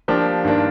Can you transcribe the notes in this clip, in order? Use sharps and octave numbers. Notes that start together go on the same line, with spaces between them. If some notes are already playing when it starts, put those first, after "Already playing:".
F3 A#3 D4 G4
G2 D#3 A#3 D4